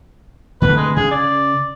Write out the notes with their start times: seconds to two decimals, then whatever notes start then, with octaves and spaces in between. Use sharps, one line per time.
0.62 D3 A3 C4 B4
0.77 G#3
0.96 C#3 G#4
1.11 D5